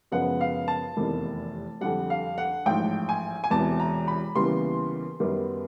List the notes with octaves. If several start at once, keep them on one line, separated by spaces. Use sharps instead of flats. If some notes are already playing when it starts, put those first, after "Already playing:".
F#2 C#3 F3 G#3 B3 F#5
F5
A5
F1 E2 C3 D#3
F2 D3 G3 F#5
F5
F#5
A1 G#2 F3 G5
G#5
G#5
E1 E2 C3 E3 A5
A#5
B5
D#2 C#3 E3 G3 B3 C6
F#2 D#3 G3 B3